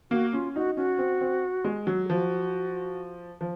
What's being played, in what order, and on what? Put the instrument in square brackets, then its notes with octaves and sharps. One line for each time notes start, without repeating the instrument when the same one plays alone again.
[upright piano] A#3 [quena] F#4
[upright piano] C#4 [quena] F4
[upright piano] D#4 [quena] F#4
[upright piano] C#4 [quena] F#4
[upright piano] C4
C4
G#3
F#3
[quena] G#4
[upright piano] F3 [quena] F#4
[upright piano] F3